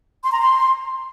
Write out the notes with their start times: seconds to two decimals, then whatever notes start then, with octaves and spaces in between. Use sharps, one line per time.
0.24 C6
0.32 A#5
0.39 C6